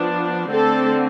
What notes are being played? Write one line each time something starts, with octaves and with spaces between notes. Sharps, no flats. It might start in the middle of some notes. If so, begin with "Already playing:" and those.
Already playing: F3 B3 D4
D3 A3 C4 A4